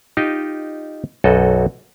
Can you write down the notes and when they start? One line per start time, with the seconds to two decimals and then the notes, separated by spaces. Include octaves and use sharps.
0.17 D#4 F4 G4 D#5
1.24 B1 F#2 F#4 A4 D#5